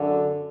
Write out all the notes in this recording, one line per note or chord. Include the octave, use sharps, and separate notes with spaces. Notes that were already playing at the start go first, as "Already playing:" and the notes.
Already playing: F#2 D3